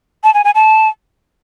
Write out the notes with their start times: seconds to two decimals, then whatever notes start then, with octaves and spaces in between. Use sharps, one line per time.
0.24 A5
0.34 G#5
0.45 G#5
0.55 A5